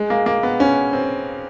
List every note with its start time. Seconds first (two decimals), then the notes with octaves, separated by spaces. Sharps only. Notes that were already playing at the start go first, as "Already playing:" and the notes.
Already playing: G#3
0.10 A#3
0.26 A#3
0.43 B3
0.60 C#4
0.93 C4